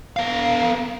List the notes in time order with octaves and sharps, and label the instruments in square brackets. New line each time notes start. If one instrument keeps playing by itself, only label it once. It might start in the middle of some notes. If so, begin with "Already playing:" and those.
[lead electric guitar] B3 F5